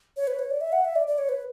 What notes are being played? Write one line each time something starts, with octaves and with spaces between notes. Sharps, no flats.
C#5
B4
C#5
D5
E5
F#5
E5
D5
D5
C#5
B4